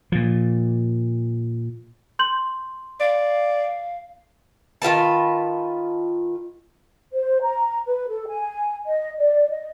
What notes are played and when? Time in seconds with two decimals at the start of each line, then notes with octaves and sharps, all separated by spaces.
0.12 A#2 F3
2.19 C6 G6 F#7
3.00 D5 F5
4.82 D#3 F4 B4 A5
7.13 C5
7.42 A#5
7.86 B4
8.08 A4
8.28 G#5
8.86 D#5
9.18 D5
9.50 D#5